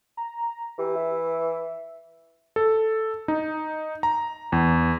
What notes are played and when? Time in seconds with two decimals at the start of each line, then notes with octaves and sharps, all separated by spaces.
0.17 A#5
0.78 E3 G4
0.96 E5
2.56 A4
3.28 D#4
4.03 A#5
4.52 E2